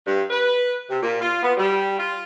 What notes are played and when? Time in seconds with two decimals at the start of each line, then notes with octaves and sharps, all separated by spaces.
0.05 G2
0.30 B4
0.89 C3
1.02 A#2
1.21 F4
1.42 B3
1.57 G3
1.98 F4